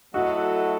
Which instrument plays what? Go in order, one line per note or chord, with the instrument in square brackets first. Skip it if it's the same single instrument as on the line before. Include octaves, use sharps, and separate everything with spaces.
[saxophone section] F#3 A3 E4 A4 D#5 [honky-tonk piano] F#4